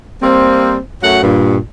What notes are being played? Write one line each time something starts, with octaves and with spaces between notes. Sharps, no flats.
G3 A#3 C4
F#2 F#3 A3 F#4 F#5
G2 A#2